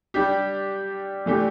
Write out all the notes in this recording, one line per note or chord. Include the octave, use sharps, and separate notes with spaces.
G3 D4 G4
E3 A3 D4 G4